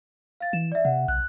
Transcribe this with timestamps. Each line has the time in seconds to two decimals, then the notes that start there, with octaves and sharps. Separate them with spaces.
0.40 F5 A6
0.53 E3 E7
0.72 D5 E5
0.85 C3 F#5
1.08 B1 F#6